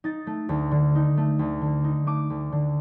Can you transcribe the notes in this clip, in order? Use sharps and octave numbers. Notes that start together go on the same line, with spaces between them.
D#4 A6
A3
D2
D3
D#4
A3
D2
D3
D#4
A3 D6
D2
D3